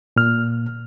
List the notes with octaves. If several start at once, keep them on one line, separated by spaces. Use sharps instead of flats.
A#2 F6